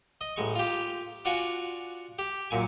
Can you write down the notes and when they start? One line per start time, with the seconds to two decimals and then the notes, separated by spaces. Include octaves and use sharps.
0.21 D#5
0.36 A1 G#3 C#6
0.55 F4 G4
1.25 D4 F4 F#4 F#5 G#5
2.19 G4
2.50 F#2 A#2 G#5